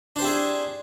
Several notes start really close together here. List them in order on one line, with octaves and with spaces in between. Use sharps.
D4 C5 G4 E4 G#4